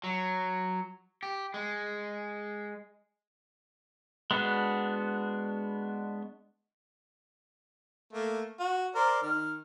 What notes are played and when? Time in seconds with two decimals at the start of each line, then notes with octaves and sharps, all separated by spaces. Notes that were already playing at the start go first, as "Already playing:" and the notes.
0.04 F#3
1.23 G4
1.54 G#3
4.31 G#3 B3 D4 F#4
8.13 A3 A#3
8.60 F#4
8.95 A#4 C5 D5
9.22 D#3 F6